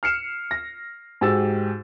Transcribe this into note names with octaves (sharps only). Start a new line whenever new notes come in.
F6 C7 C#7 E7
A#6
G#2 F#4 G4 E6 A6